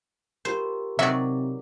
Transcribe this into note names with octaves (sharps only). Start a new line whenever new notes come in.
F4 G4 A#4 C5
C3 D#3 F#3 F#4 D5 E5